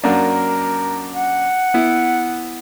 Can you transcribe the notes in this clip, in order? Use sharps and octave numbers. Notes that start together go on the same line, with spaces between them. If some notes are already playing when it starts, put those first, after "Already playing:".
F#2 A#3 D4 A#4
F#5
B3 E4